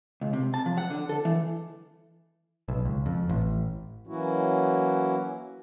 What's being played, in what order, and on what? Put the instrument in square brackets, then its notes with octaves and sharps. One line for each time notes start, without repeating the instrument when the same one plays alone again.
[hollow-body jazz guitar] C#2
C3
A5
F3
F#5
D3
A4
E3
[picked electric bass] B1
C#2
F2
A1
[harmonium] E3 F#3 A#3 C#4 E4 F#4